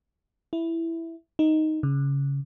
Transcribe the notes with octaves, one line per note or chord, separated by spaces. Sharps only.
E4
D#4
C#3